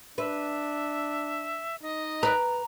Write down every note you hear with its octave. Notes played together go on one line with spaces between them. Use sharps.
D4 B4 E5
D#4 D#5
B4 D5 A#5